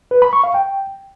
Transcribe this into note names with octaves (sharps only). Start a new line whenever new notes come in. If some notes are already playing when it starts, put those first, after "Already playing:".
B4
B5
C#6
F5
G5